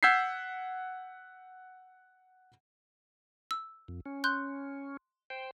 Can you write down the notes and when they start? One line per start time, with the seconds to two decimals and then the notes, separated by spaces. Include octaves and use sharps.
0.03 F#5 E6 G6 G#6 B6 C7
3.51 E6
3.88 F2
4.06 C#4
4.24 C6 F#6 G6
5.30 C5 G5